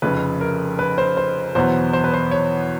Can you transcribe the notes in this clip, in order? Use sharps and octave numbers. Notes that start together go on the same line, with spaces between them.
F1 F2 C#3 B4
A#4
B4
C5
C5
E2 B2 F#3 B3 C5
C5
B4
C5
C#5